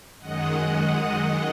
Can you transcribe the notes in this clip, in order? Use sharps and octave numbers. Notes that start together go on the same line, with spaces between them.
F#2 D#3 G#3 D#5 F#5